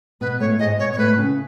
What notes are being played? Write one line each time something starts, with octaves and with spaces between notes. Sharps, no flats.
B2 B3 B4
A2 A3 C#5
G#2 G#3 D#5
B2 B3 C#5
C#5
A2 A3 B4
C#3 C#4